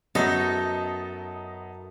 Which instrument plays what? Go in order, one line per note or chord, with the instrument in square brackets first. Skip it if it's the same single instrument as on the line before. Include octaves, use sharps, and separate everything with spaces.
[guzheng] F#2 D#4 E4 [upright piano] F#3 B3 D#5 [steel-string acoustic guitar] A4